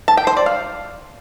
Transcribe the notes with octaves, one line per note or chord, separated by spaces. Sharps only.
A5
G5
C5
D5
F5